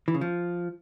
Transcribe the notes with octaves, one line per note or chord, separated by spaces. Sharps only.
E3
C#3
F3